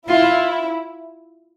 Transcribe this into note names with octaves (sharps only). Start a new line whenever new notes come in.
E4 F4